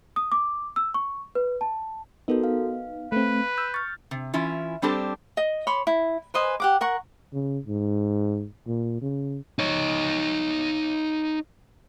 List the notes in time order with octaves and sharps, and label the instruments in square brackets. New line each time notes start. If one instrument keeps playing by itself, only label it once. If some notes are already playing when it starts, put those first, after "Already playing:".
[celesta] D#6
D6
E6
C#6
B4
A5
[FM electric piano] B3 D#4 [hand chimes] F#4 A4 A#4
[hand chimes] F5
[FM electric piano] A3 C4 [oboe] B4
[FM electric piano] E6 [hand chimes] G6
[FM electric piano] C#6 [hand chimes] F6 A6
[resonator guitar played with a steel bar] C3
E3 C#4 E4 F4
G3 C4 D4 G4 A4 C5
[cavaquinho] D#5
C#5 B5 C6 D6
E4
B4 C5 D#5 G#5
G4 F#5 D6
A#4 F#5 C#6
[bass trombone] C#3
G#2
A#2
C#3
[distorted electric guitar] D#4 C#5